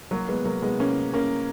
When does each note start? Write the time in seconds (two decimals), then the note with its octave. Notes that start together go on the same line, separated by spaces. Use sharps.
0.11 F#3 A#3
0.28 G#3 B3
0.45 F#3 A#3
0.62 G#3 B3
0.79 A#3 C#4
1.14 A#3 C#4